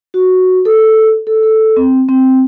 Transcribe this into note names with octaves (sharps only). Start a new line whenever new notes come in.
F#4
A4
A4
A4
C4
C4